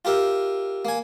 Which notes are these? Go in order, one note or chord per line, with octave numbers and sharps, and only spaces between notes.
F4 G4 A#4 E5
A#3 G#5